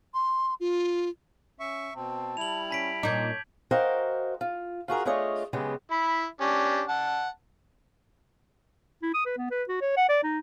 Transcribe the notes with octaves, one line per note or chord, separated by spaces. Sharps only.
C6
F4
C#4 E5 C#6
B2 C4 A5
G3 E4 F7 F#7
C#4 A5 B6 D7
A#2 D#4 C#5 D6 G6 G#6
F#4 A#4 C5 D#5 F5 G5
F4
F4 F#4 G#4 A#4
A3 D4 F4 G#4 C#5 D#5
C#3 F#3 G#3 B3 G4
E4 B5
C#4 D4 G4
F#5 A5
E4
D#6
B4
B3
B4
F#4
C#5
F#5
D5
D#4